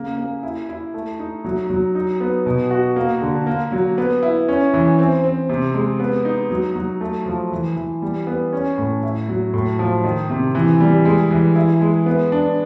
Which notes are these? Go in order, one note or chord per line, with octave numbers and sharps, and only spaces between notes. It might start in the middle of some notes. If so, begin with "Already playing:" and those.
Already playing: C#3 A#3
A#3
E4
E4
A3
D#4
F#3
F#3
D#4
B3
B2
F#4
A#3
D3
A#3
F#3
B3
E4
C#4
E3
C4
C4
C3
G#3
B3
D#4
F#3
F#3
A3
F3
E3
E3
G3
B3
C#4
A2
E4
F#3
A2
F3
D#3
C3
E3
G3
G#3
E3
E4
G#3
B3
D4